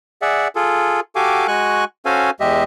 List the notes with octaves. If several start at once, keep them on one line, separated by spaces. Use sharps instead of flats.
G#4 D5 E5 F#5
F4 G#4 A4
F#4 G4 A4 F5 G#5 D6
G#3 F#4 G#5 C#6 F#6
C#4 F#4 A4 C5 F5 G#5
E2 G#3 G4 D#5 E5